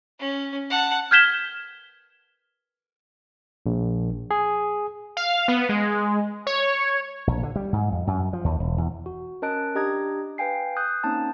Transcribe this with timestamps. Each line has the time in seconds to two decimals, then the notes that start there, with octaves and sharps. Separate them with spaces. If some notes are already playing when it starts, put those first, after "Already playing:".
0.19 C#4
0.70 F#5 A5
1.11 F6 G6 G#6 B6 E7 G7
3.66 A#1
4.31 G#4
5.17 F5
5.48 B3
5.69 G#3
6.47 C#5
7.27 A#1
7.43 D3
7.56 G3
7.73 G#2
7.93 F2
8.07 F#2
8.33 F3
8.44 D#2
8.60 E1
8.78 E2
9.06 F#4
9.42 C#4 A#4 D#5 A5 F#6 D7
9.75 D4 G4 D#5 A#5 D#6 G#6
10.38 B4 F5 G5 G#5 C7
10.77 D#6 F#6 G6
11.04 A#3 C4 C#4 D#4 A5